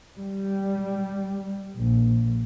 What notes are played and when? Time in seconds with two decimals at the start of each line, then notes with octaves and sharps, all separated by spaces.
0.16 G3
1.77 A#1